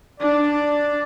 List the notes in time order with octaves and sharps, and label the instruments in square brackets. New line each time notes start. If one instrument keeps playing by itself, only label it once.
[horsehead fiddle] D4 [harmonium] D5